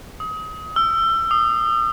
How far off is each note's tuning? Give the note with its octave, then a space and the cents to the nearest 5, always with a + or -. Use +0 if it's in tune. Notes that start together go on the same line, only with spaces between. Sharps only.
D#6 +30
E6 +30
D#6 -30